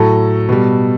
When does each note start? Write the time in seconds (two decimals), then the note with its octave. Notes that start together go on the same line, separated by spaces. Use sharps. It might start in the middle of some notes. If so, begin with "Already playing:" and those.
Already playing: A2 F#3 A4
0.49 B2 G3